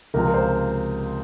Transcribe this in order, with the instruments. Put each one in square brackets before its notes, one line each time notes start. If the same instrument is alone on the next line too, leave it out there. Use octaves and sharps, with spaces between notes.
[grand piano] C#2 C3 F3 A#4
C5